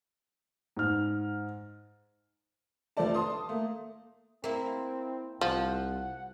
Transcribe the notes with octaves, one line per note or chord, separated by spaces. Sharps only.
G#2 F6
F1 F3 A3 D5 A5
A5 C6 D#6
A3 A#3
A#3 C4 E4
C2 F3 F#5